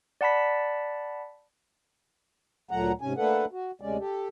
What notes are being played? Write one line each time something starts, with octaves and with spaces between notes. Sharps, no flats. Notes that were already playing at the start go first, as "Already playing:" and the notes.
D5 F#5 A5 B5 B6
D2 A#2 F#3 A3 F#5 A#5
G#2 C3 C#4 G#5
A3 A#3 D4 A4 B4 F#5
F#4
D2 C3 G#3 C#4 D5
G4 A4